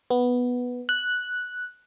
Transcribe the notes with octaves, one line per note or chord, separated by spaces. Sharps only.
B3
F#6